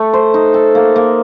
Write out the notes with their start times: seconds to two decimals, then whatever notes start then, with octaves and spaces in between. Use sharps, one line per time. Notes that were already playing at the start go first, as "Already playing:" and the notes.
Already playing: A3
0.13 C5
0.34 D#4
0.54 A4
0.75 A#3
0.96 A#3